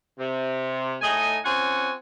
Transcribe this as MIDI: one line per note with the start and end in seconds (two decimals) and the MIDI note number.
0.19 0.95 48
1.02 1.38 45
1.02 1.38 57
1.02 1.38 63
1.02 1.38 75
1.02 1.38 80
1.44 1.91 60
1.44 1.91 61
1.44 1.91 65
1.44 1.91 73
1.44 1.91 78
1.44 1.91 80